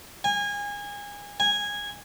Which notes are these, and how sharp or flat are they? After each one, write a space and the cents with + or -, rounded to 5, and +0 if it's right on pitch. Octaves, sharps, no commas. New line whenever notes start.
G#5 -25
G#5 -10